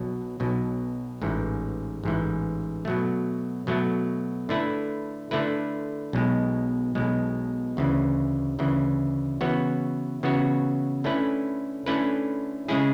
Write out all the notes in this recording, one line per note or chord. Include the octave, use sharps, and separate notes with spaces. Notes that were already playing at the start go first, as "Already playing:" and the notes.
Already playing: B1 B2 F#3
B1 B2 F#3
A1 G#2 E3
A1 G#2 E3
B2 F#3 A3
B2 F#3 A3
D3 A3 E4 B4
D3 A3 E4 B4
B1 B2 G#3
B1 B2 G#3
D2 C#3 E3
D2 C#3 E3
C#3 E3 B3 F#4 C#5
C#3 E3 B3 F#4 C#5
D3 A3 C#4 E4 B4
D3 A3 C#4 E4 B4
C#3 G#3 C#4 E4 G#4